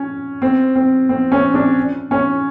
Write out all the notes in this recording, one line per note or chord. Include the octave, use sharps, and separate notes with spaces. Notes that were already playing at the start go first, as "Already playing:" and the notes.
Already playing: C#4
C4
C4
C4
C#4
D4
C#4